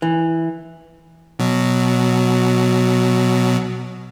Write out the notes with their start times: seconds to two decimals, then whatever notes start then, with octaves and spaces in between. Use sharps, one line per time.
0.02 E3
1.39 B2 F#3